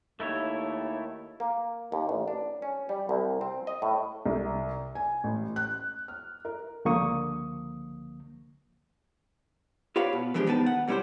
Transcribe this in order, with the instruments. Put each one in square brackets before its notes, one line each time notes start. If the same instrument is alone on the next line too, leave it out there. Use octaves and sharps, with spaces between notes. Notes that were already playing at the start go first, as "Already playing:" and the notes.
[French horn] D#2 [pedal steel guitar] A3 E4 C#5
[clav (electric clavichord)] A#3
D#2
A1
D4
C#4
G3
C2
C4
D#5
A2
[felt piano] C2
G#5
A1
F#6
F6
A#4
[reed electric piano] C#2 D3 F3 A#3 C#6 D#6
[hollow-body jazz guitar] F4 G4 B4 C#5 F5
B2
E3 F3 G#3 D4 G4
D#3 B3 D#4 B4 A5
F#5
C3 G3 C#4 E4 G4 C5